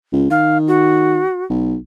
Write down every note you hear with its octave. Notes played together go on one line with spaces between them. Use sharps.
C#2
D#3 F5
F#4
B1